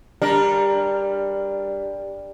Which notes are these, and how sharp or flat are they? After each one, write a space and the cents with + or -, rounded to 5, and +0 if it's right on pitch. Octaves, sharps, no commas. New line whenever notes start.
G3 +15 D4 +0 A#4 +5